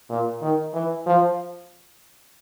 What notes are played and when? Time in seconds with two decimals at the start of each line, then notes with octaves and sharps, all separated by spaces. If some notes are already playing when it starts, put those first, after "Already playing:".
0.10 A#2
0.41 D#3
0.74 E3
1.06 F3